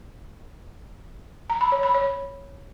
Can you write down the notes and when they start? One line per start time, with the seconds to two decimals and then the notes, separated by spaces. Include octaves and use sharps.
1.50 A#5
1.61 B5
1.72 C#5
1.83 B5
1.94 C#5